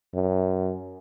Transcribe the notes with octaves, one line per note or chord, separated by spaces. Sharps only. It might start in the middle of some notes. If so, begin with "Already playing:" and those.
F#2